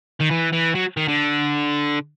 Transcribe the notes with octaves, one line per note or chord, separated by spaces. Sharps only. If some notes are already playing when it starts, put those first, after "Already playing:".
D#3
E3
E3
F#3
D#3
D3